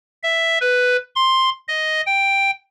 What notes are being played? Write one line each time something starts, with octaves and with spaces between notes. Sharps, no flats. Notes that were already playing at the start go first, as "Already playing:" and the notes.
E5
B4
C6
D#5
G5